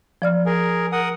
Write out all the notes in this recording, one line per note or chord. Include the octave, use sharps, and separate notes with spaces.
F3 D5 F6
G#4 A#4
A#4 F#5 D#6